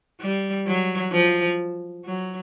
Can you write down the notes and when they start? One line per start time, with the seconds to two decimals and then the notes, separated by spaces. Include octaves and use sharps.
0.21 G3
0.67 F#3
1.12 F3
2.05 F#3